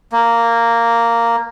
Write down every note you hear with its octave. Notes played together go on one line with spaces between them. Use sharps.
A#3